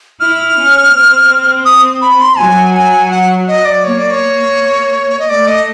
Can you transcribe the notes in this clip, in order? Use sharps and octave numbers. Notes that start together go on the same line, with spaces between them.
E4 F6
C#4
C4
D#6
B5
C6
F#3 G#5
G#5
F#5
D#5
D5
A#3 C#5
D5
C#5
D#5
A3 D5
D#5